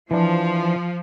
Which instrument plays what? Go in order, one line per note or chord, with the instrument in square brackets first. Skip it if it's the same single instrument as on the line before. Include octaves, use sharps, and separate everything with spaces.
[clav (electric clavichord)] E3 D4 [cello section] F3